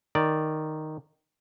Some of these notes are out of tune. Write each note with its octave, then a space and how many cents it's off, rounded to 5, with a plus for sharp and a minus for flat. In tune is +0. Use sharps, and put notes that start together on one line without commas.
D#3 -5 D5 +0